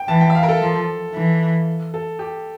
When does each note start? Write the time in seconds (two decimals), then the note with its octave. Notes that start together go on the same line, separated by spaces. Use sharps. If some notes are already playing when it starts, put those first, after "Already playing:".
Already playing: G5
0.08 E3 A5
0.21 G5
0.30 E5
0.35 F5
0.43 A#4
0.49 A4
0.61 F3
1.14 E3
1.94 A4
2.19 G4